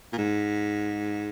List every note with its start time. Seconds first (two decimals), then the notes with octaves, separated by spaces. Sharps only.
0.13 A#2
0.18 G#2